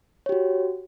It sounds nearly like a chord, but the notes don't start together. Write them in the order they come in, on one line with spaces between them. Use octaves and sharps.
C#5 G4 F#4